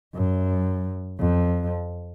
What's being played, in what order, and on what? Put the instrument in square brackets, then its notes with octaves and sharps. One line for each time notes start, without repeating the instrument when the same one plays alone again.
[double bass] F#2
F2